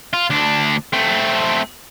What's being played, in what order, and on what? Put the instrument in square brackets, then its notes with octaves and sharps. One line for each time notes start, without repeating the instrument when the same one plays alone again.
[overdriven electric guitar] F4
D2 D4
A3 C4